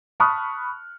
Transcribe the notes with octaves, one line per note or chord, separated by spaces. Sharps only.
A5 B5 C#6 D#6 F6 F#6